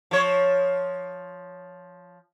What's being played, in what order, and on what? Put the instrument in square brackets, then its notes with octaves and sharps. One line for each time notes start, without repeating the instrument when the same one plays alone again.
[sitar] F3 C#5